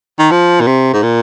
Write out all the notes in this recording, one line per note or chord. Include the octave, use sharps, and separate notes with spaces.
D#3
F3
A#2
C3
G#2
A#2